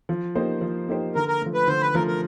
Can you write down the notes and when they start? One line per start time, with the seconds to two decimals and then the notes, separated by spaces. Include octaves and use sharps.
0.09 F3
0.35 A#3 D#4 G4 C5
0.61 F3
0.89 A#3 D#4 G4 C5
1.15 D3 A#4
1.28 A#4
1.41 F3 A3
1.54 B4
1.67 D3 C5
1.81 B4
1.94 F3 A3 A#4
2.07 A#4